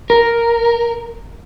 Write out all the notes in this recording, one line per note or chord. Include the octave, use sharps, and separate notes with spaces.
A#4